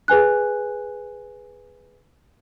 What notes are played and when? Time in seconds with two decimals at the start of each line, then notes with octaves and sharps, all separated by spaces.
0.08 G#4 B4 G#5 F#6